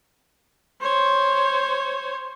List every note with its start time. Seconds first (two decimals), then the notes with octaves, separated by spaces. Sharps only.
0.81 C5 C#5